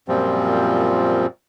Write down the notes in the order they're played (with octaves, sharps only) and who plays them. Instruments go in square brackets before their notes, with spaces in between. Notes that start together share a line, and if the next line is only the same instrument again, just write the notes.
[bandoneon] F#2 A#2 F3 G3 C4